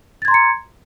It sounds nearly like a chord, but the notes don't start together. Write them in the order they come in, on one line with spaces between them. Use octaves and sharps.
A6 G#6 C6 A#5 C#7